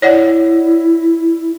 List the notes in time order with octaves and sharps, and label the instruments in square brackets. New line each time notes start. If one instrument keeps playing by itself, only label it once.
[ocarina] E4 [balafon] C#5 D5 F#5